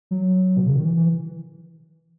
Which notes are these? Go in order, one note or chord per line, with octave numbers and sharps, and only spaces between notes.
F#3
B2
C#3
D#3
E3
E3